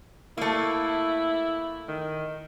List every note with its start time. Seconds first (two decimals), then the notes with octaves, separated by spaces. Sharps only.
0.37 A3 A#3 E4
1.88 D#3